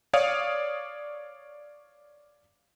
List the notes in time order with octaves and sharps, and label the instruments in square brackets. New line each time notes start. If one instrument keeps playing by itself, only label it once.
[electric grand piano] C#5 D5 F5 D#6